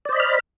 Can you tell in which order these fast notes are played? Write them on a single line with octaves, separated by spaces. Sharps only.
D5 C5 D#5 B5 F6